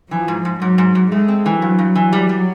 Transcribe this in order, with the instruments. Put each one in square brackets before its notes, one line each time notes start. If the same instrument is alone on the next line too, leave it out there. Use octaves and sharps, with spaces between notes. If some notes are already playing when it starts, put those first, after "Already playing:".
[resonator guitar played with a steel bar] E3 [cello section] F3
[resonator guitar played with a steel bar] G#2
G#2
[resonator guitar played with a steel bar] G#2 [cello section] F#3
[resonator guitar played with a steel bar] G#2
G#2
[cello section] G#3 [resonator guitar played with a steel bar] A3
[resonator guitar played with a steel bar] C4
E3
[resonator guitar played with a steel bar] G2 [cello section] F#3
[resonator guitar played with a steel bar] G2
E3
G3
G3